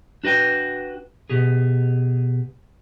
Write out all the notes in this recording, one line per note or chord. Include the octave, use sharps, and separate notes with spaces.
D4 F#4 B4 G5
B2 G4 G#4